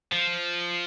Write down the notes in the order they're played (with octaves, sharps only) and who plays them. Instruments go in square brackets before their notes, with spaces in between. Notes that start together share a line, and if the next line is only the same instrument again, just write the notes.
[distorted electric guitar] F3